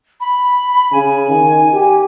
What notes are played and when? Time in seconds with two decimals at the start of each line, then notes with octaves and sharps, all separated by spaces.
0.20 B5
0.92 C#3 G#5
1.30 D#3
1.74 G4